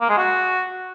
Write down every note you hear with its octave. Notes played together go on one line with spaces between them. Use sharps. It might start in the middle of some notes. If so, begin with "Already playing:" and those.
A#3
G#3
F#4